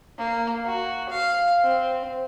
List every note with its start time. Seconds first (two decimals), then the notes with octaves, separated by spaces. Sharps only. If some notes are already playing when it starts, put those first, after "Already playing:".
0.18 A#3
0.66 F#4
1.09 F5
1.63 C4